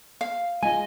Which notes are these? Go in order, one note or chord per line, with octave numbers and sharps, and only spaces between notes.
F5
G#3 F4 D#5 G#5